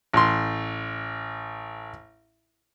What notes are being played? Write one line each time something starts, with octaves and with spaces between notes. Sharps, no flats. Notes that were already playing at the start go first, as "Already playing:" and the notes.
A1 C6